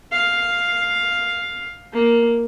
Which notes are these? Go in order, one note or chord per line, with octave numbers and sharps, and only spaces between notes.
F5
A#3